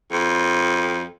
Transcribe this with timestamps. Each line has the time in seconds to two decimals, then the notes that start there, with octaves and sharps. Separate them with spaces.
0.12 F2